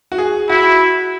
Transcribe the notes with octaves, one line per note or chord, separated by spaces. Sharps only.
F#4
G#4
E4 F#4